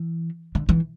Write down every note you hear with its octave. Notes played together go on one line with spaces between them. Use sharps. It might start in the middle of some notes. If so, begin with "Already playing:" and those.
Already playing: E3
D3
E3